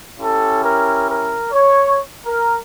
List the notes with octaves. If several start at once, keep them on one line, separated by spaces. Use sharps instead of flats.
C#4 E4 G4 A4
A#4
A#4
C#5
A#4